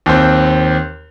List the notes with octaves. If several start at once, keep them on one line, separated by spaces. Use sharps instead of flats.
D#2 C4